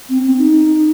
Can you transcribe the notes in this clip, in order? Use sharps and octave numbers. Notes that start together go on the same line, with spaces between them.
C4
C4
D#4